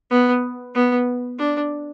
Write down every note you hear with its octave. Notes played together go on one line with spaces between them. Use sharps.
B3
B3
D4